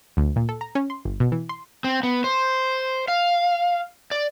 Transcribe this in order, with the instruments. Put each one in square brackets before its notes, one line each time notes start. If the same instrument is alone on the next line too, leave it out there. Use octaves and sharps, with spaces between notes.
[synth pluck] D2
A#2
A4
A#5
C#4
C6
G1
B2
E3
C6
[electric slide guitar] C4
B3
C5
F5
D5